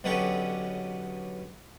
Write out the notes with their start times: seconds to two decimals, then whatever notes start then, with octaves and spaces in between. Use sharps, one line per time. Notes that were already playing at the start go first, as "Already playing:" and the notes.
0.04 B1 B2 D3 B3 C#4 G4